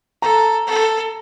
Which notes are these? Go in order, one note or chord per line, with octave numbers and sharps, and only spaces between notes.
A4 A#5
A4